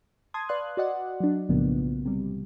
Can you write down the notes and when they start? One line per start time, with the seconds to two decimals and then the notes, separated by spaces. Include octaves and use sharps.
0.34 A5 C6 D#6 G#6
0.49 B4 D5 F5 C6 F#6
0.77 F#4 D5 D#5 F#5
1.20 F#3 D4
1.49 B1 A2 C#3 F3 A#3 B3
2.05 C3 G3